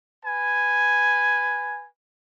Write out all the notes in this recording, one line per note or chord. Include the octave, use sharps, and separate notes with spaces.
B4 G#5